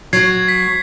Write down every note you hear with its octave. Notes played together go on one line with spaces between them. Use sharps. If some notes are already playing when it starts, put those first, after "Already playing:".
F#3 G#6 C7
B6